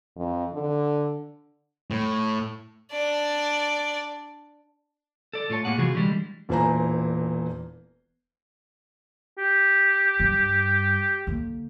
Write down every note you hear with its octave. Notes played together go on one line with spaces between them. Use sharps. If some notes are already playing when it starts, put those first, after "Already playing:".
F2
D3
A2
D4 D5
A4 D5
A2 F4 C#5 A5
A2 A#3 G#4 F#5
C3 E3 F3 F#4 G#4
D3 E3 F3 G3 G#3
E1 A#2 E3 C5 G#5 A#5
G4
G2
D3 A#3